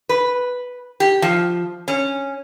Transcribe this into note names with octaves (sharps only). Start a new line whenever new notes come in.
B4
G4
F3
C#4